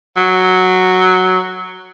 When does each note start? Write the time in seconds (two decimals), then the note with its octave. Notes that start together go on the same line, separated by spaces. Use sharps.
0.17 F#3